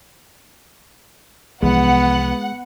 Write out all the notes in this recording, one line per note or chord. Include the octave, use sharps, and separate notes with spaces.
C2 E3 F3 G#3 B3 F#5